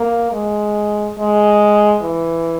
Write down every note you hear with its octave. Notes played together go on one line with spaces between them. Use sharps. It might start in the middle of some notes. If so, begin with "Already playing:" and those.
Already playing: A#3
G#3
G#3
E3